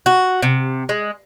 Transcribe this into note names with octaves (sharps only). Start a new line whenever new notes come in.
F#4
C3
G#3